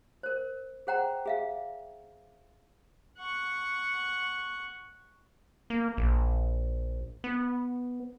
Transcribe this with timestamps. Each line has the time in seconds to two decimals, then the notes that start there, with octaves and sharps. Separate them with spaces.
0.23 A#4 C5
0.87 G#4 C5 F#5 G5 A#5
1.26 G#4 E5 F5
3.18 F#5 C#6
5.70 A#3
5.97 A#1
7.24 B3